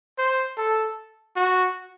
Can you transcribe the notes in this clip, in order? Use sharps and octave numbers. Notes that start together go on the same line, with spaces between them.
C5
A4
F#4